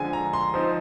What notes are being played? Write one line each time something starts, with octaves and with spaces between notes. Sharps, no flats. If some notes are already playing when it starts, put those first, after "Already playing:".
Already playing: D3 F3 G#3 G#5
A#5
C6
F3 C4 D#4